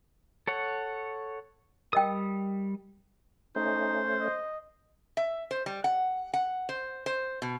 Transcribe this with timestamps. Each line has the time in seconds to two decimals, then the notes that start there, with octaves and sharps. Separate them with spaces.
0.47 A4 C#5 F#5
1.93 G3 A#4 D#5 G5 D#6
3.56 A3 C#4 D#4 C5
4.20 D#5
5.17 E5
5.51 C5
5.66 G3
5.84 F#5
6.34 F#5
6.69 C5
7.06 C5
7.42 B2